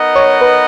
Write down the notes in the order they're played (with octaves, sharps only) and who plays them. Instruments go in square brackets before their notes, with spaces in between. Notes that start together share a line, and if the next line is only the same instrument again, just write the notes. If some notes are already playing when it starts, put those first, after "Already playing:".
Already playing: [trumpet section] B3 D#4 A#4 D#5 F#5
[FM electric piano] C#5
B4